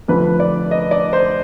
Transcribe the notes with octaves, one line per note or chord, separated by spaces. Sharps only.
F1 F2 D3 F3 B4
D5
D#5
D5
C5